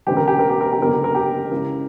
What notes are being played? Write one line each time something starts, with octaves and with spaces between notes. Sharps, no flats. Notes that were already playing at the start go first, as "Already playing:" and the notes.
E1 D2 C#3 G4
A#4
G4
A#4
G4
A#4
G4
F#1 E2 D3 A#4
G4
A#4
G4
C#2 C#3 E3 A#4